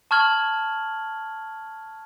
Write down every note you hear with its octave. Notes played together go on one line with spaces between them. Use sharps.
A5 C#6 F6 G#6 F#7